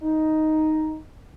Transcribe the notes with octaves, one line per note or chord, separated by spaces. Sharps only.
D#4